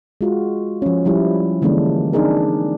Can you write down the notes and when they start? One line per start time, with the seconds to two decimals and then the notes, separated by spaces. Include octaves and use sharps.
0.21 G#3 F4 F#4
0.82 F3 C#4
1.05 F3 G3 E4
1.62 D3 E3 G#3 A#3 C#4 D4
2.13 C4 D4 D#4 G#4 A#4